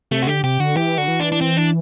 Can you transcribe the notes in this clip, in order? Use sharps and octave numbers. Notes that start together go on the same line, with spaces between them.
C3 A3
F#4
D3 G4
C3 G4
D3 F#4
E3 G4
D3 F#4
E3
D4
D4
C4
D4